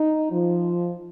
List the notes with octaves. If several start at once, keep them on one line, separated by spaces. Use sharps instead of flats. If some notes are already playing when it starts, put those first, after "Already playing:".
Already playing: D#4
F3